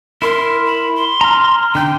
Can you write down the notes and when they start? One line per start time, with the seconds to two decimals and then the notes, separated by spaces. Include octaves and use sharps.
0.22 E4 A#4 C6
0.67 B5
0.96 C6
1.21 A#5 F6
1.75 D3 G5 G6